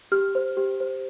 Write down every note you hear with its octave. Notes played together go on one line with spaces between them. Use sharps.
G4 F6
C5
G4
C5